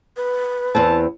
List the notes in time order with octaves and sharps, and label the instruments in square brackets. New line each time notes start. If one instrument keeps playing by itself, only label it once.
[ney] B4
[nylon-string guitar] E2 B3 C4 [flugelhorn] A5